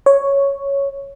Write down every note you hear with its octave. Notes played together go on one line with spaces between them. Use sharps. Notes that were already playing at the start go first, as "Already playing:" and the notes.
C#5